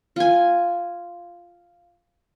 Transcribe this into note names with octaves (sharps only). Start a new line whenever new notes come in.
F4 G#5